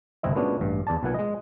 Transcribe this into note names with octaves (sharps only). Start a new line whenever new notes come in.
G1 C2 C4 E4 D#5
A#2 G#3 B3 C#4 D4 F#4
A1 G2
E2 D5 A5
B1 A#2 B4 F#5 G#5
G#3 D#5